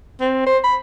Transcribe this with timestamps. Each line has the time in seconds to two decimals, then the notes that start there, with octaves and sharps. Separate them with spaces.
0.21 C4
0.47 C5
0.64 B5